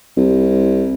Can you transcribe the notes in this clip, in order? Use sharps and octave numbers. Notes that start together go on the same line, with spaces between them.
C2